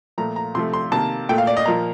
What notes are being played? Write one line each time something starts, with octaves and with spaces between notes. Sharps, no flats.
A#2 F3 A3 A#5
A#5
C3 F3 A3 C6
C6
C3 D#3 A#3 A5
A#2 A3 G5
F5
D5
D#5
A#2 F3 A#3 A#5